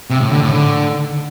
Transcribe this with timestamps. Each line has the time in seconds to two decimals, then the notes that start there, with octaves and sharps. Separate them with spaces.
0.10 C3
0.21 A2
0.31 D3
0.42 A2
0.53 D3